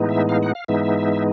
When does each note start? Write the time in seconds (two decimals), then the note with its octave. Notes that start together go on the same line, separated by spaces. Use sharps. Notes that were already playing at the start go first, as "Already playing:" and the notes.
Already playing: A2 E3 G#3 B3 D#4
0.09 E5
0.29 F5
0.43 F#5
0.55 F5
0.68 G#2 E3 G#3 B3 D#4 E5